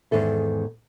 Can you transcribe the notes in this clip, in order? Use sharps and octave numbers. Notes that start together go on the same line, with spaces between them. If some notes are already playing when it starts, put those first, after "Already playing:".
E2 G#2 D#3 A4 E5